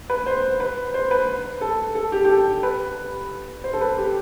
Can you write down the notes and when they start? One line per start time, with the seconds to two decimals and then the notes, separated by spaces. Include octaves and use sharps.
0.10 B4
0.26 C5
0.60 B4
0.94 C5
1.11 B4
1.61 A4
1.95 A4
2.12 G4
2.24 G4
2.29 A4
2.63 B4
3.64 C5
3.73 A4
3.81 B4
3.98 G4